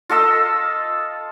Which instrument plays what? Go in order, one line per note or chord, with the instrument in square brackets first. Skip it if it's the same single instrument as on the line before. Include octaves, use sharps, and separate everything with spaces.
[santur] F4 A4 D#5 E6